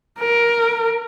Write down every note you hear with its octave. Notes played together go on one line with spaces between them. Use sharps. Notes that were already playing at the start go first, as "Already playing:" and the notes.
A#4